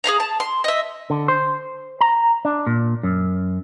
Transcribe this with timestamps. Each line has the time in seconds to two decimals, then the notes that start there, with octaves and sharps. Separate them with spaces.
0.04 G#4 D#5 F5 A#5
0.20 A5
0.40 C6
0.64 D#5 E5
1.10 D3
1.28 C5
2.01 A#5
2.45 D4
2.67 A#2
3.03 F#2